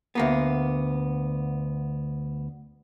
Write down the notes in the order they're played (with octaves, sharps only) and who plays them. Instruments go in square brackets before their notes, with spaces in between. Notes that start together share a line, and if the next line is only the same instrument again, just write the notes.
[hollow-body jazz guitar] D2 A#3 B3